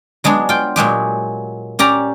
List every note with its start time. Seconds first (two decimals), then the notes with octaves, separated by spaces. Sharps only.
0.24 F#3 G#3 B3 D4
0.49 F4 G5
0.76 A#2 F#3 G#3 G4
1.79 C#4 G4 D5 A#5